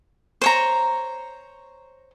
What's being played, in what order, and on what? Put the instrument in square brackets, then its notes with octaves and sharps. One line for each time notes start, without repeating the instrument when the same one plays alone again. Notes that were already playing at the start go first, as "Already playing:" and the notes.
[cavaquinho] C5 C#5 A#5